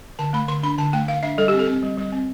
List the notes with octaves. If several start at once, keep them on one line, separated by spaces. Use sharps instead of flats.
D3 A5
A3 B5
D3 C6
D4 B5
D3 A5
A3 G5
D3 F5
D4 E5
G3 A4
C4 G4
A4
C4
G3
G3
C4